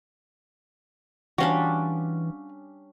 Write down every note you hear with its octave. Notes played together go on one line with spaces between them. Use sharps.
E3 G3 C#4 D4 F4 F#4